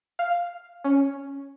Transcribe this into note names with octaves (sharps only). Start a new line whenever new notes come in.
F5
C#4